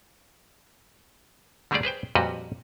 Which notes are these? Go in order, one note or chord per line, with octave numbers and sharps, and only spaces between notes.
D3 G3 A3 G4 G#4 D5
G#4 B4 C5 G5
F2 A#2 G3 F#4 B4 D#5